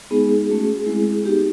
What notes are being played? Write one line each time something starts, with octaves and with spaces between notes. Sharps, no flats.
G#3 B3 D#4 G#4
A3 C#4 F#4
G#3 C4 E4
B3 D#4 F#4 G4